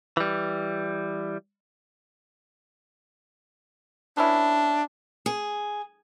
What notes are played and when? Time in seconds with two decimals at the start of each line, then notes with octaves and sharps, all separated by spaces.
0.17 E3 G3
4.17 B3 C#4 D4 E4
5.26 G#4